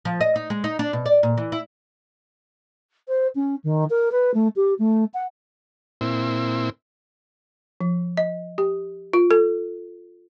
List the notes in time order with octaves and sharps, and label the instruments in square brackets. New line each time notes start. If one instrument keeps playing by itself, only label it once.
[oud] F3
D#5
D#4
G#3
D#4
D4
B2
D5
A#2
E3
E4
[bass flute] C5
C#4
D#3
A#4
B4
A3
G4
A3
F#5
[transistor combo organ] A#2 C4 E4
[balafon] F3
D#5
G4
F4
A4